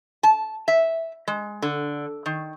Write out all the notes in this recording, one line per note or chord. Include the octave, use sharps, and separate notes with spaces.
A5
E5
G#3
D3
D#3